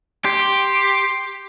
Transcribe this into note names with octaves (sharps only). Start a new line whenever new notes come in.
G4 C6